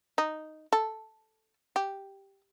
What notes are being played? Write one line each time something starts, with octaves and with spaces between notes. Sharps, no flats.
D#4
A4
G4